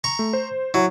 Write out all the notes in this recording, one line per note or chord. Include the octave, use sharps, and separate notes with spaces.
A#5 C#6
A3
C5
F#3 E4